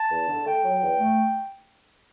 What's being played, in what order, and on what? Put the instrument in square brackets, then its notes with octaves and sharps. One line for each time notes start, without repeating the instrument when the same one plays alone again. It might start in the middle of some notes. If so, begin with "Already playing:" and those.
Already playing: [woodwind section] A5
E2
D3
A3 G5
F#3
E2
A3